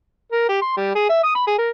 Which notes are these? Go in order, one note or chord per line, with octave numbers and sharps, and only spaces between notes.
A#4
G4
C6
G3
G#4
E5
D#6
B5
G#4
A#4